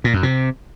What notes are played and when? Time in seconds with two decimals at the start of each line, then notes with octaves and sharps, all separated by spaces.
0.04 A#2
0.14 F#2
0.23 C3